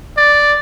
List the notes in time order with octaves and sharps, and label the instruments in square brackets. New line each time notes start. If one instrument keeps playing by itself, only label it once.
[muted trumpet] D5